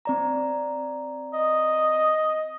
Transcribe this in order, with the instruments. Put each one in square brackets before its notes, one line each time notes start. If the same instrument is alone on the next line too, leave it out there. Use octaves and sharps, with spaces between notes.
[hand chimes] C4 D5 A#5
[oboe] D#5